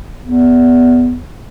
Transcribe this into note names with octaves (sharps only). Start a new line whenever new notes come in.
E2